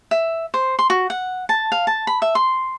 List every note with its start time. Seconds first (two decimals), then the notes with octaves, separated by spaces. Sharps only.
0.11 E5
0.54 C5
0.79 C6
0.90 F#4
1.10 F#5
1.49 A5
1.72 F5
1.87 A5
2.07 B5
2.22 E5
2.35 C6